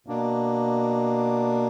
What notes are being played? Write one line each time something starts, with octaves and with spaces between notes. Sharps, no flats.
B2 A#3 D4